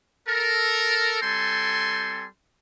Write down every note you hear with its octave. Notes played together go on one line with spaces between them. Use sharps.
A4 A#4
G3 C4 A4 G5 G#5 C6